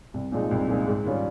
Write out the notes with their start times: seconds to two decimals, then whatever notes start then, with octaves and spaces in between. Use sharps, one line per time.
0.14 C2
0.32 A#2 F3 G#3 D#4
0.51 C2
0.68 A#2 F3 G#3 D#4
0.87 G#2
1.05 D#3 G3 C#4 F4